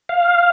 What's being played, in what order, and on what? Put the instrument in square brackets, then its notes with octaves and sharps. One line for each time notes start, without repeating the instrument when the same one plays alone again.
[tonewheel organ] F5